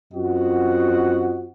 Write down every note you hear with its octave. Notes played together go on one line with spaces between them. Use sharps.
F#2 C4 F4 F#4 D#5 F#5